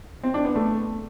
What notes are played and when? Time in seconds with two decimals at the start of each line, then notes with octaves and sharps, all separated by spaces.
0.24 C4
0.34 D4
0.45 B3
0.55 A3